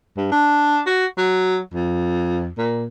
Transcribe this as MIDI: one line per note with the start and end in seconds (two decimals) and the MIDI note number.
0.17 0.31 43
0.32 0.80 62
0.87 1.06 66
1.18 1.59 54
1.74 2.48 41
2.58 2.85 46